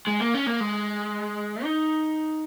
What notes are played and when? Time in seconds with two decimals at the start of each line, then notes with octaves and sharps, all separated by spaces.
0.08 G#3
0.21 A#3
0.35 C#4
0.47 A#3
0.60 G#3
1.64 D#4